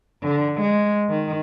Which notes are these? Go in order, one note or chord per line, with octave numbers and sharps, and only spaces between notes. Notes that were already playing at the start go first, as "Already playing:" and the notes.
D3
G#3
D#3